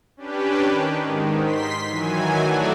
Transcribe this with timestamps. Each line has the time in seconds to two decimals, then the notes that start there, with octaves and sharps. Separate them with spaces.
0.17 C#4 D4 G4 B4
0.66 D#3
1.03 G#2 D#3
1.41 C6 B6
1.88 D#3 E3 F#3 G#5
2.40 F#3 A3 F#4 A4 C#5 D5